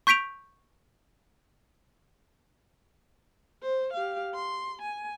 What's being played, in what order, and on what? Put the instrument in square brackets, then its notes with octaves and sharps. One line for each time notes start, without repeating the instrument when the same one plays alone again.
[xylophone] C#6 G6 B6 D7 F7
[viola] C5
G4 F5
C6
G#5